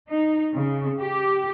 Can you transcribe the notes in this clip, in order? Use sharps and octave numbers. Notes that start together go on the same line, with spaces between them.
D#4
C#3
G4